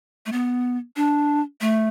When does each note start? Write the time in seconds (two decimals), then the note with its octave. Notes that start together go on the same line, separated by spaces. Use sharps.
0.26 A3
0.32 B3
0.96 D4
1.61 A3